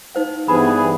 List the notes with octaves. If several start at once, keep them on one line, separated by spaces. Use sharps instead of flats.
D#4 C5 F5
G2 E3 B3 G#4 B5